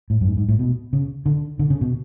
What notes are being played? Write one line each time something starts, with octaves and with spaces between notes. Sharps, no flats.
A2
F#2
G#2
G#2
A2
B2
C#3
D3
D3
C#3
B2